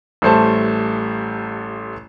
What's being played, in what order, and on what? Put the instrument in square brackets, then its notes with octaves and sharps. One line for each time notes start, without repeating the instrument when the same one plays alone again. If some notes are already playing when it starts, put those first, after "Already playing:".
[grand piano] A1 G3 A3 C5 A5